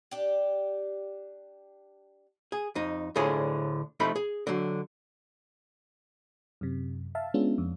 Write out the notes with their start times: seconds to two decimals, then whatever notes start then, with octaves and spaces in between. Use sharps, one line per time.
0.11 D4 G4
2.52 G#4
2.75 F2 D#4
3.16 D2 A2 D3 F4 G#4 C#5
4.00 C3 F3 A3 D#4 B5
4.16 G#4
4.47 D3 F#3
6.61 F#2 C3
7.15 E5 F5 A5
7.34 G#3 B3 C#4 D4 F4
7.58 F2